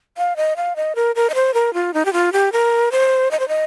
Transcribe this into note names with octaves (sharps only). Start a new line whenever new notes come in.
F5
D#5
F5
D#5
A#4
A#4
D#5
C5
A#4
F4
D#4
G4
F4
G4
A#4
C5
D#5
C5
D#5